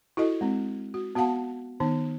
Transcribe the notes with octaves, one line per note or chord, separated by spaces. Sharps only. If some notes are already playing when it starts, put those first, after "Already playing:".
E4 F#4 A4 D#5
G#3 C4
F#4
B3 F#4 F5 F#5 A5
D#3 B3 D#4